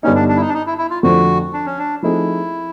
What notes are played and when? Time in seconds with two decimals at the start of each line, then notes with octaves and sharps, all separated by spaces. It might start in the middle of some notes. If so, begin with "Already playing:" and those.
0.03 G2 D3 G3 B3 C#4 D#4
0.16 D4
0.29 D4
0.36 E4
0.41 D#4
0.49 D4
0.54 D#4
0.66 E4
0.78 E4
0.90 F4
1.03 F2 D3 F3 A3 F#4
1.53 D4
1.66 C#4
1.78 D4
2.03 F3 A3 C4 D#4 E4 G#4